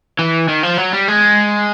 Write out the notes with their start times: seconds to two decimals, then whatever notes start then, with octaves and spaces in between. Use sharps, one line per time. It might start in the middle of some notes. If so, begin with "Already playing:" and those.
0.19 E3
0.49 D#3
0.63 F3
0.78 F#3
0.92 G3
1.08 G#3